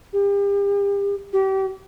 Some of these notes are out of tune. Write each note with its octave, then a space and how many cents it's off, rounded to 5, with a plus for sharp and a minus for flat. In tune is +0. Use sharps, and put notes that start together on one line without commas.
G4 +40
G4 -30